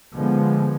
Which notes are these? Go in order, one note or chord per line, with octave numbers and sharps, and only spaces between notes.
D3 F3 G#3 B3